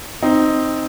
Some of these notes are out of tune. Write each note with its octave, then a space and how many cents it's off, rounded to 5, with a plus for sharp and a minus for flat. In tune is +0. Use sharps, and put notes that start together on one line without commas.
C4 +0 D#4 +0